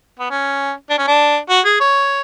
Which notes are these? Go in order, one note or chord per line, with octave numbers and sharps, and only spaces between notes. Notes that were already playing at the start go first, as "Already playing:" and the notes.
B3
C#4
D4
C#4
D4
F#4
G#4
C#5